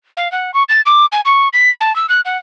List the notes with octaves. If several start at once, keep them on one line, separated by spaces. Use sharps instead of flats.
F5
F#5
C#6
A6
D6
G#5
C#6
B6
A5
E6
F#6
F#5